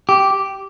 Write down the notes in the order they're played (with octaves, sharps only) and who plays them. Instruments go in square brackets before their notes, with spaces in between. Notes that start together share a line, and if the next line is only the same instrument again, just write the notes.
[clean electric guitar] G4